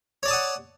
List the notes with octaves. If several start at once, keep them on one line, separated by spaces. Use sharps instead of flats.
C#5 D5 F#5 A5 D#6